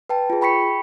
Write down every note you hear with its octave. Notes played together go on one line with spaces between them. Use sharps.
B4 G5 A5
F4 G#4
G5 B5 C#6 B6 C#7